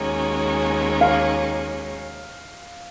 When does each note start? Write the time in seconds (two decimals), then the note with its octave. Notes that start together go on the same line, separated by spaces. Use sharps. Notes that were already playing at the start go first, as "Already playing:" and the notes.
Already playing: D#2 D#3 G#3 C#4 F#4
1.01 F5